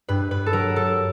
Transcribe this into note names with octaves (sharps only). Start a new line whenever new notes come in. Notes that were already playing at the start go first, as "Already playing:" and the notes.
G2 B4
B4
A4
F#3 A#4
A4